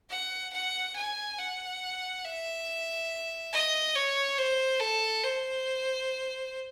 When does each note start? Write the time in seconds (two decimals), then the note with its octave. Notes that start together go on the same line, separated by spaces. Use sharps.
0.10 F#5
0.53 F#5
0.96 G#5
1.39 F#5
2.25 E5
3.52 D#5
3.95 C#5
4.38 C5
4.80 A4
5.24 C5